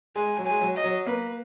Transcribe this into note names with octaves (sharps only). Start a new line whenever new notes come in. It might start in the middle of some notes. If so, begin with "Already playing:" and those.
G#3 G#5
F#3
G#3 G#5
F#3
D#5
F#3
A#3 B4